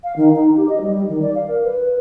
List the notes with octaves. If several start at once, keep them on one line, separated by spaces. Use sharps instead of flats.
F5
D#3
D#4
G4
D#5
G3
D#3
D5
F5
A#4
B4